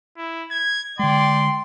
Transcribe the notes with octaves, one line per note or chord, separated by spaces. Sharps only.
E4
G#6
D3 G#3 D5 G5 C6